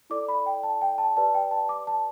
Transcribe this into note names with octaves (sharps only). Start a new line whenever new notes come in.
E4 A4 D5 D6
B5
G5
A5
G5
A5
G4 B4 D5 A5
G5
A5
D6
A5